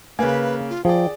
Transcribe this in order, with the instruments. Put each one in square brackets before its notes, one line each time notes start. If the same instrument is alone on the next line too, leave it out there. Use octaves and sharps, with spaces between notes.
[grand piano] C#3 A#3 [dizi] B4 [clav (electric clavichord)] F5 G#5
[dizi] F4
[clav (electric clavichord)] F3 [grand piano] G#4 D5 [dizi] G5